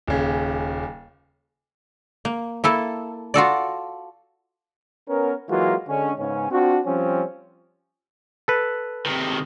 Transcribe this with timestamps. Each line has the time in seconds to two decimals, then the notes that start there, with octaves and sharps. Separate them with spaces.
0.07 D#1 C#3
2.25 A#3
2.64 A#3 E4 A4
3.34 F4 F#4 A4 D5
5.08 B3 C#4 A#4
5.49 E3 F#3 G#3 A#3 F4 F#4
5.88 D3 G#3 C#4
6.19 G#2 C#3 B3 C#4
6.51 C4 D4 F4 F#4
6.85 F3 G3 C4 C#4
8.48 A4 B4
9.06 C3 D#3